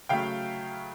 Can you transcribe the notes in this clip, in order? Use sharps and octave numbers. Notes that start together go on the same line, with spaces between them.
C#3 F#3 A3 F5 G5